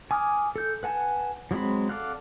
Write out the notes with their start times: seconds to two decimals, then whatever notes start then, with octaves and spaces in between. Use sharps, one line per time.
0.11 G#5 D6 D#6 F6
0.56 A4 G6
0.83 B4 F#5 G#5 A5
1.51 F3 F#3 G#3 C4 B5
1.89 A4 D5 F5 F#5